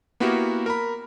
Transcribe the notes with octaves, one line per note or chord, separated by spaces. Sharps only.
A#3 B3 E4 F#4 G4 A#4
A#4 A#5 B5